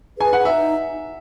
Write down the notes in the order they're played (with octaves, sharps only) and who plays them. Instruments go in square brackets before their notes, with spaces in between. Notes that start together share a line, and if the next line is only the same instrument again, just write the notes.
[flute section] G#4 B4 [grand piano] G#5
[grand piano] F#5
[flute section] D#4 [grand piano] E5